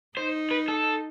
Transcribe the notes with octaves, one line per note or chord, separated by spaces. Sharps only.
D#4 C5
B4
A4